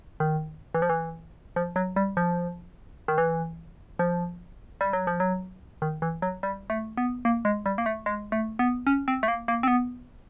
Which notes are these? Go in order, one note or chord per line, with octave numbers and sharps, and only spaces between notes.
D#3
E3
F3
E3
F3
F#3
G3
F3
D#3
E3
F3
G3
F#3
F3
F#3
D#3
E3
F#3
G3
A3
B3
A#3
G#3
G3
A#3
A3
G#3
A3
B3
C#4
C4
A3
A#3
A#3
C4
B3